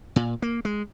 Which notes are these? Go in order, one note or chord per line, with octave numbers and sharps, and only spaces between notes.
A#2
A#3
G#3